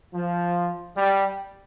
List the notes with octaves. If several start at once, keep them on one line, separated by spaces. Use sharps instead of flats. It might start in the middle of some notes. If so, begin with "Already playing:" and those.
F3
G3